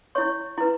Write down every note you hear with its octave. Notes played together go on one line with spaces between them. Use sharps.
E4 C#5 C#6
E4 B4